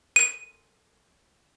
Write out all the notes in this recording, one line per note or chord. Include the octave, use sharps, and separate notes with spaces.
D#7